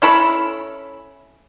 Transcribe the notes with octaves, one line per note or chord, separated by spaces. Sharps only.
C#4 E4 A4 B5